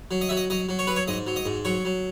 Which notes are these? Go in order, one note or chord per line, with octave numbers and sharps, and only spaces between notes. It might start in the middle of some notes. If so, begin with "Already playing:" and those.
F#3
D#5
F#3 E5
D#5
F#3 D#5
F#3
C#5
F#3 B4
C#5
G#2 D#5
F#3
D#5
G#2
F#3 C#5
F#3